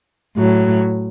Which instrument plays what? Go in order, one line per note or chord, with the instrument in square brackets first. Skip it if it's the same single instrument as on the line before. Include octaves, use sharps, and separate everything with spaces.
[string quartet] A2 F#3